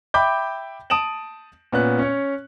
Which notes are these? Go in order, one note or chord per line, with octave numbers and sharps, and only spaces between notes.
E5 G5 B5 D6 G6
A5 D#6 D7 E7 F#7
A#2 B3 C#4 F#6
C#4 C#5